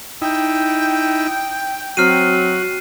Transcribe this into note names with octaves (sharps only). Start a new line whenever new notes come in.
D#4 E4 G5
F#3 C4 F#4 F6 C7 D#7